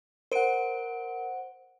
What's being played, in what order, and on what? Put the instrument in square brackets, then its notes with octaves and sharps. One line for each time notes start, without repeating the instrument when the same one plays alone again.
[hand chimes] A#4 D7 [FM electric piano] C5 F#5